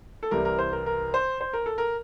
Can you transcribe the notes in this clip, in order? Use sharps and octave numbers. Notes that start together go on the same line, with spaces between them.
A4
C2 C3 E3 G3 A#4
A#4
C5
A#4
A#4
C5
C5
A#4
A4
A#4